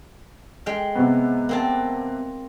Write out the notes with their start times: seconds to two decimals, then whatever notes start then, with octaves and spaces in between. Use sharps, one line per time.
0.66 G#3 G5
0.95 C3 B3
1.49 A#3 C4 A5